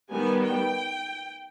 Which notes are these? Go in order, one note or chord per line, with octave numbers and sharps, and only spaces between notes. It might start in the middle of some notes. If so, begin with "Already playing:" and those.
D#3 G3 B3 G#5
G5